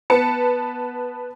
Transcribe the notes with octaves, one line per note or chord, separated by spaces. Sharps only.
B3 B4 A5 C#7